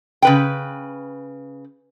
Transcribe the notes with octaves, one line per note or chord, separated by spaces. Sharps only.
C#3 B4 G5